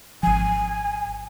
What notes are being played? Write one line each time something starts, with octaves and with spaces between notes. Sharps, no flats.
G#1 F3 G#5